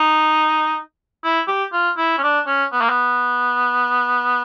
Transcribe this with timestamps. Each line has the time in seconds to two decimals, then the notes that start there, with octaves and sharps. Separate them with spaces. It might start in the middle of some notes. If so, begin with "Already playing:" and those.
Already playing: D#4
1.24 E4
1.48 G4
1.73 F4
1.97 E4
2.18 C#4
2.23 D4
2.47 C#4
2.72 B3
2.81 A#3
2.90 B3